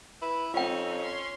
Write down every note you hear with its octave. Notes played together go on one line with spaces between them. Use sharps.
E4 B4
F2 C4 C#4 D#4 F4 G5
C6